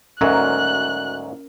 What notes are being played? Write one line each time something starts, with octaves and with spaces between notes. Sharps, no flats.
D2 G#2 F#3 C#4 A#4 F#6